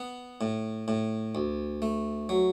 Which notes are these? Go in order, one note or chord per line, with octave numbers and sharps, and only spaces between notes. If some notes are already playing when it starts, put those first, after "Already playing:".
Already playing: B3
A2
A2
D2
A3
F#3